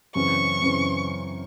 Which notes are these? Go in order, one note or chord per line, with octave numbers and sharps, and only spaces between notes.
F#2 C#3 E3 C4 C#6
F#2 C#3 E3 C4